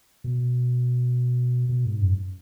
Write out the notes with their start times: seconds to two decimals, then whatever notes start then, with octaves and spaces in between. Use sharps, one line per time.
0.24 B2
1.69 B2
1.85 G#2
2.01 F#2